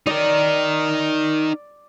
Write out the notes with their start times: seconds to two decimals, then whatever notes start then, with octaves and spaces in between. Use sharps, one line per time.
0.07 D#4 A#4 D5